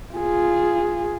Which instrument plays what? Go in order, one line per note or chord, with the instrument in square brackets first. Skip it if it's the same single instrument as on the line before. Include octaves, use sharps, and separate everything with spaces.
[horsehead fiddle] F4 G#4